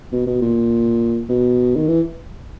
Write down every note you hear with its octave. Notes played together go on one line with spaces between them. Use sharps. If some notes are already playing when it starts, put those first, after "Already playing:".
B2
B2
A#2
B2
D#3
E3